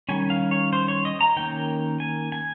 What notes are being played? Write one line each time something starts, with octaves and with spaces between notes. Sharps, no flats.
D#3 G3 C#4 G#5
F5
C#5
C5
C#5
D#5
A#5
D#3 A#3 C#4 G5
G#5
G#5